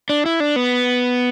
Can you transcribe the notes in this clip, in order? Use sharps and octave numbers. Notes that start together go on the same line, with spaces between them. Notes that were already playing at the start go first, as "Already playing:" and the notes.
D4
E4
D4
B3